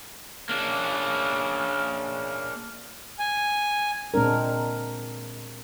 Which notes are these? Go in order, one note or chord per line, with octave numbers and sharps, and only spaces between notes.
C#3 A#3 D4
G#5
A#2 G#3 C4 D4 A#4